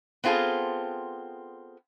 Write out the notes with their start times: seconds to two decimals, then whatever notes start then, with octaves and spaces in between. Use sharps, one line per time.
0.24 B3 C4 F4 G#4 A4